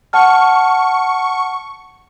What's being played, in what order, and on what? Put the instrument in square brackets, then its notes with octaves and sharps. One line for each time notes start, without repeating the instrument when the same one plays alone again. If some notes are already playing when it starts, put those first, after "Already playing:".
[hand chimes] F#5 A5 F6 [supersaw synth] C#6